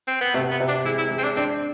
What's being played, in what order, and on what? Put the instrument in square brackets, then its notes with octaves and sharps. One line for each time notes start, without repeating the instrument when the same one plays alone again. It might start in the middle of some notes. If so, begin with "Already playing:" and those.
[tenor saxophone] C4
B3
[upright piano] C3 [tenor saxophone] A3
[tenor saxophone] B3
[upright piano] C3
[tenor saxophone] D4
[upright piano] G#3 [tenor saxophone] E4
[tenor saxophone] E4
[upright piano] G#3
[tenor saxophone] C4
D4
[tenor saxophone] C4 [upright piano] D4